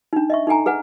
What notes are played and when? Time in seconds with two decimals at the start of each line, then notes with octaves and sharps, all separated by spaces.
0.13 D4 D#4
0.30 D#5 E5 C#6
0.47 D#4 A4 G5 G#5 A#5
0.66 G#4 B4 F#5 G#5